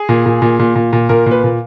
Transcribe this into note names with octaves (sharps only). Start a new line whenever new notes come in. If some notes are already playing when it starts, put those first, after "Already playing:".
Already playing: G#4
A#2
A#2
A#2
A#2
A#2
A#2
A#2 A#4
A#2
B4
A#2